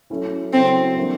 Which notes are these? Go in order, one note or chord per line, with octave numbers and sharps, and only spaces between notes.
F#3 A3 C#4 E4
C#3 F#3 A3 C4 C#4 E4
E3 G3 A#3 D4